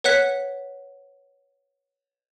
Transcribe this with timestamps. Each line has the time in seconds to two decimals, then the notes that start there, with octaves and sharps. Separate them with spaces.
0.04 B4 C#5 F#5 F#6 B6